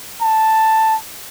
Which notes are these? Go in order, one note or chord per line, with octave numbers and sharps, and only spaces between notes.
A5